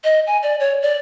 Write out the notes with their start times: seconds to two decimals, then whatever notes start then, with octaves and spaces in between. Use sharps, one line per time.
0.04 D#5
0.27 G#5
0.43 D5
0.60 C#5
0.82 D5